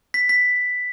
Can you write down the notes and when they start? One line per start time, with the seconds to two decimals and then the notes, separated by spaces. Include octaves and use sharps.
0.14 B6
0.29 B6